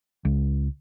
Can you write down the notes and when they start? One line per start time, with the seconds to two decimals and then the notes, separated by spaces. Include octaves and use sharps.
0.25 C#2